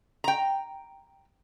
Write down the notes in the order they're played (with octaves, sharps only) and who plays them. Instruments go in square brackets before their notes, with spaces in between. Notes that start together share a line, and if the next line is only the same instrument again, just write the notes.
[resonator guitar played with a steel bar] G5 A#5